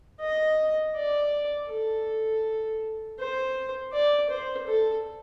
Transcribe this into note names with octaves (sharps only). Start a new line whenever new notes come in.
D#5
D5
A4
C5
D5
C5
A4